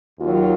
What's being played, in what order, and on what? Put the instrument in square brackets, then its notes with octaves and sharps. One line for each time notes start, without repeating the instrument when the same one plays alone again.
[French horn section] D#2 D#3 F#3 F4